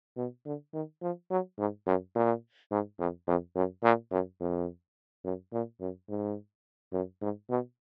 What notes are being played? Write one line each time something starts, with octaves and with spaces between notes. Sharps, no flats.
B2
D3
D#3
F3
F#3
G#2
F#2
A#2
G#2
F2
F2
F#2
A#2
F#2
F2
F#2
A#2
F#2
G#2
F#2
G#2
B2